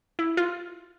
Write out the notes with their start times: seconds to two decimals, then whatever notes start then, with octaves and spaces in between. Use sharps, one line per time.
0.19 E4
0.37 F4